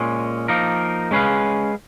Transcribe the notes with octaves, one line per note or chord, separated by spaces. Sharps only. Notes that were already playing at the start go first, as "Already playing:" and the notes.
Already playing: A#2 G#3 C#4
F3 A#3 D#4 A#4
G#3 C#4 G#4 B4 F5